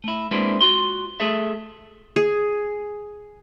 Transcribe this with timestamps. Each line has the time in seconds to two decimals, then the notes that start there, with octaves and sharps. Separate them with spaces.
0.04 A3 E4
0.31 G#3 A#3 C4 D4 E4 B4
0.61 F4 F#4 C6
1.20 A3 G#4 A4 E5
2.16 G#4